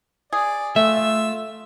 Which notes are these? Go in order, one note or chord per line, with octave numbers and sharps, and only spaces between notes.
G#4 D5
A3 F4 E5 E6